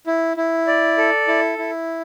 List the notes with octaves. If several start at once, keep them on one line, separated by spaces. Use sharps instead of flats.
E4
E4
D5
A4
E4
E4